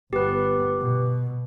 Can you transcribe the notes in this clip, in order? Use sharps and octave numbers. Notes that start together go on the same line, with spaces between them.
G1 B3 G4 B4
B2